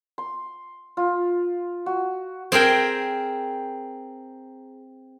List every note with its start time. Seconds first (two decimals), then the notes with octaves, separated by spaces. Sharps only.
0.18 C6
0.97 F4
1.86 F#4
2.52 C4 G#4 A#4 G5